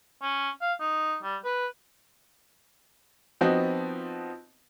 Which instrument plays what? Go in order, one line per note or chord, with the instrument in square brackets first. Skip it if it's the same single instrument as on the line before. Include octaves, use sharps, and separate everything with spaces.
[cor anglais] C#4
F5
D#4
G3
B4
[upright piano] F3 B3 C4 D#4 F#4